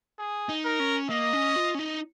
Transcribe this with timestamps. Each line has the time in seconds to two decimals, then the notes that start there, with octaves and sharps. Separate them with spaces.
0.19 G#4
0.49 D#4
0.65 A#4
0.80 C#4
1.10 A#3 D#5
1.33 C#4
1.56 F4
1.75 C#4
1.79 D#4